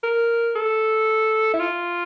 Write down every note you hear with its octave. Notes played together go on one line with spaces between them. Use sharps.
A#4
A4
E4
F4